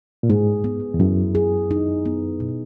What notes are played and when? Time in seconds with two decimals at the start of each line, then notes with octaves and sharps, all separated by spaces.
0.23 A#2
0.30 G#2 G#4
0.64 B3
0.94 E2
1.00 F#2 E4
1.35 G#4
1.71 D#4
2.06 B3
2.40 B2